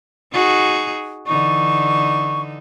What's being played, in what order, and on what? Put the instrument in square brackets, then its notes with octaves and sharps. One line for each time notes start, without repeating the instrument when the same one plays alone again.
[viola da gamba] D#4 F#4 G#4
[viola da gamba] D3 E3 D#4 [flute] C#6